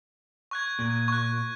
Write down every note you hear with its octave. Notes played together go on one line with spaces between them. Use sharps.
C#6 F#6 G#6
A#2
C#6 F#6